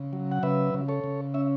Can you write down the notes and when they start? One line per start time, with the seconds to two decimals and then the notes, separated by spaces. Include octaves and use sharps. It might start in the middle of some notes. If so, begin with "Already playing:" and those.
Already playing: C#3
0.13 F#3
0.32 F#5
0.43 C#3 B4 E5
0.74 C#3
0.88 A4 C#5
1.04 C#3
1.34 C#4 E5